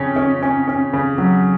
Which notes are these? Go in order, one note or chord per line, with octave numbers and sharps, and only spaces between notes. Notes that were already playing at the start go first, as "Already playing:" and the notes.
Already playing: F2 C#3 C#4
C#4
C#4
C#4
C#3
F#3